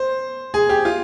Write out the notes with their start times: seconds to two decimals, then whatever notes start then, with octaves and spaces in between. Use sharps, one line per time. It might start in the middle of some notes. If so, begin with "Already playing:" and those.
Already playing: C5
0.54 G#4
0.69 G4
0.85 F4